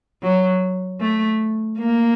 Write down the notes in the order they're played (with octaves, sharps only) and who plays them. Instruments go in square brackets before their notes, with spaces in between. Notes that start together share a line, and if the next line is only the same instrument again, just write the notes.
[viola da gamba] F#3
A3
A#3